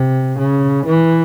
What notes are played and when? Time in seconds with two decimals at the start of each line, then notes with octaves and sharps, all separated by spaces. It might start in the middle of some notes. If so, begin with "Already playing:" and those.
Already playing: C3
0.39 C#3
0.86 E3